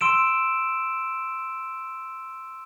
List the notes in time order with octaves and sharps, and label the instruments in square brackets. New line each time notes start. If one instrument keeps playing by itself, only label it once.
[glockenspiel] C6 E6 D7 E7